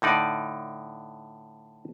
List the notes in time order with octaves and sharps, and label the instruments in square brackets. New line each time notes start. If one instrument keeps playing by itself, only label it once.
[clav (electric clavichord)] A2 D3 D#4 D5